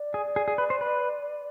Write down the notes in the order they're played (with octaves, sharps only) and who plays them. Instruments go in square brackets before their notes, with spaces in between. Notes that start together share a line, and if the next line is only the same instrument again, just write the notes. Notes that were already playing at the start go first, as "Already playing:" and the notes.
Already playing: [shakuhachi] D5
[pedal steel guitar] G#4
G#4
G#4
B4
C5
B4